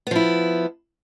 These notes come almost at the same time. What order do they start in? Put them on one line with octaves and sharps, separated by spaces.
B3 F3 E4